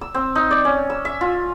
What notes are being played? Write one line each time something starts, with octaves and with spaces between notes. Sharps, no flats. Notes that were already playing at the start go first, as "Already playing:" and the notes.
E6
C4
D#4
D5
C#4
E6
E5
F4